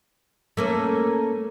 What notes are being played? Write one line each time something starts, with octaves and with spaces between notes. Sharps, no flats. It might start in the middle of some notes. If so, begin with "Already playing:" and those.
A3 A#3 C#4